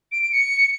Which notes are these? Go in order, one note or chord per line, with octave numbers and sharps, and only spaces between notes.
D7
D7
C#7